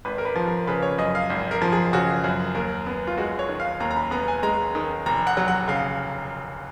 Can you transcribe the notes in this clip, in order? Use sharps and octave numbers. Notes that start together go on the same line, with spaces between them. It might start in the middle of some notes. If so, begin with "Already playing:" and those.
G#1 B4
A#4
B4
F3
A#4
C#3 B4
C#5
F#2 D#5
F5
G#1
A#4
F3
G#4
C#3 F#4
F#2
D#2 A#4
B3
F4
G#3 F#4
C#5
D#3
F5
D#2 A#5
A#5
B5
B3 A#5
G#5
G#3 A#5
D#3
F1 A#5
F#5
F#3
F#5
C#3 F5